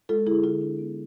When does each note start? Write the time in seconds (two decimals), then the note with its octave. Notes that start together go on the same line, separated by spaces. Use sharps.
0.09 G#3 F4 A4
0.26 D3 E4 G#4
0.43 D3 F4
0.61 D4
0.79 B3